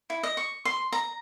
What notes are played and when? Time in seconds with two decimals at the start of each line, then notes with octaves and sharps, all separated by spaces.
0.10 E4
0.23 D#5
0.37 C#6
0.65 C6
0.92 A#5